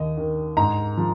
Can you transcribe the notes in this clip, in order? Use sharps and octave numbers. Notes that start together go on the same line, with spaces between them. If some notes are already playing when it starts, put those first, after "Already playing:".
Already playing: D#2 D#5
D#3
G#2 A#5
F3